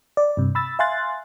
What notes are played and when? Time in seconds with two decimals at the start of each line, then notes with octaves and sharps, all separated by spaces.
0.17 D5
0.37 G2 C3
0.55 B5 E6 A6
0.79 E5 F5 G#5 C6 F#6 A6